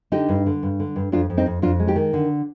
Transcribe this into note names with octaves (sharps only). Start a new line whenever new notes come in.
D3 D#4 G4
G2
D3
G2
D3
G2
F2 D4 F4
F2
C4 D#4
F2
F2 D4 F4
G#3
D#4 G4
D#3
D3